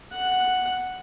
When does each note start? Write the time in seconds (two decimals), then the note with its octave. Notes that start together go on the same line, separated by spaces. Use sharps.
0.14 F#5